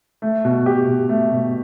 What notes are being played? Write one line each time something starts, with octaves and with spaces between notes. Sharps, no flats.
A3
B2
G4
B2
A3
B2